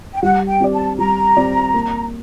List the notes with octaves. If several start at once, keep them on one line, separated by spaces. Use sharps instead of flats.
G5
G3 F#5
G5
C4 G4 D5
A5
G3 A#5
C4 G4 D5
A#3